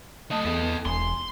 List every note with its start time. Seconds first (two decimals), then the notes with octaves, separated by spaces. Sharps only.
0.31 A3 D#5 A5
0.45 E2 B3 A4 D#5
0.86 E1 G#5 C6